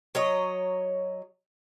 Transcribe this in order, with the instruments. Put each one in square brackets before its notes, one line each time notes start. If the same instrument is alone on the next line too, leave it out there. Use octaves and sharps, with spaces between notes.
[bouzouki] F#3 C#5 D#5